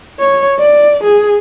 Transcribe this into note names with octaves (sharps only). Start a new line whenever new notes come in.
C#5
D5
G#4